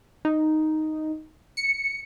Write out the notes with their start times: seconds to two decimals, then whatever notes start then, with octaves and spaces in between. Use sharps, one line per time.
0.25 D#4
1.57 C#7